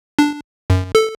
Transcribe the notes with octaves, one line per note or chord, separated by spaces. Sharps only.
D4
F#2
A4